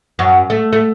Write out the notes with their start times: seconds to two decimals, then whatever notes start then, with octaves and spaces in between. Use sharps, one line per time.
0.19 F#2
0.50 A3
0.73 A3